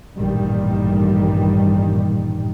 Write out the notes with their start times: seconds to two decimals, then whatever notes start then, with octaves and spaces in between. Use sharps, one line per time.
0.16 A1 G2 A#2 D#3 G3